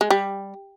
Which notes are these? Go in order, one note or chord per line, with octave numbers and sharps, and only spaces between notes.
G#3
G3